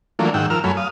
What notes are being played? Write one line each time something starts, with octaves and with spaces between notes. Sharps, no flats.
E3 F#3 A3 A#3 D4 F4
G#2 D#3 F#5 G5 E6
F3 A#4 E6 F6
F#2 F#3 A3 C#5 G#5 B5
F5 D#6